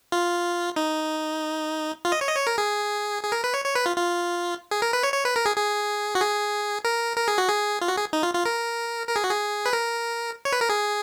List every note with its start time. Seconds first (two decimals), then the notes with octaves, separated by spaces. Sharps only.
0.12 F4
0.76 D#4
2.05 F4
2.12 D#5
2.21 C#5
2.28 D#5
2.36 C#5
2.47 A#4
2.58 G#4
3.23 G#4
3.32 A#4
3.44 B4
3.54 C#5
3.65 C#5
3.75 B4
3.86 F4
3.96 F4
4.71 G#4
4.82 A#4
4.93 B4
5.03 C#5
5.14 C#5
5.25 B4
5.36 A#4
5.46 G#4
5.56 G#4
6.15 F#4
6.21 G#4
6.85 A#4
7.17 A#4
7.28 G#4
7.38 F#4
7.48 G#4
7.81 F4
7.88 F#4
7.98 G#4
8.13 D#4
8.23 F4
8.34 F4
8.46 A#4
9.09 A#4
9.16 G#4
9.24 F#4
9.31 G#4
9.66 B4
9.73 A#4
10.45 C#5
10.52 B4
10.61 A#4
10.69 G#4